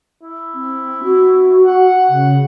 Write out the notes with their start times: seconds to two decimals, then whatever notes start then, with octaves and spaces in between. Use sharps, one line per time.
0.23 E4
0.54 C4
1.04 F#4
1.66 F#5
2.09 C#3